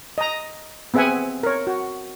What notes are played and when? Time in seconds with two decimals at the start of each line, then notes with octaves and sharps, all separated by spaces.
0.18 D#5 A#5
0.94 B3 C4 G#4 E5 F#5 G#5
1.43 A#4 C#5
1.67 F#4